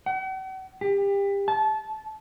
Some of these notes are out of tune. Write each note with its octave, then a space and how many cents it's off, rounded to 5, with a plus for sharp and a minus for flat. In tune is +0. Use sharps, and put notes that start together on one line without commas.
F#5 +45
G4 +30
A5 -25